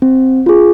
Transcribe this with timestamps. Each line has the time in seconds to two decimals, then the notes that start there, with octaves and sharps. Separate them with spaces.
0.02 C4
0.46 F4 G#4